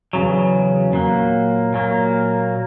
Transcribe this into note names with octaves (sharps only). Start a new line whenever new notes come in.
E2 C#3 F#3
A#2 F#3 A#3
A#2 F#3 A#3